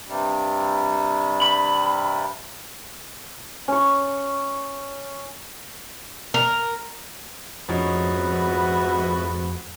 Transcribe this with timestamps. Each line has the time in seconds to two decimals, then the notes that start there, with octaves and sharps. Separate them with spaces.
0.07 G2 C3 G3
1.42 B5
3.68 C#4 C#6
6.34 A#4
7.69 F2 G#2 F3 A3 B3 C#4 D#4 F#4